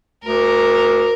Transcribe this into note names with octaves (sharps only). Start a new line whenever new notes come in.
D2 A#4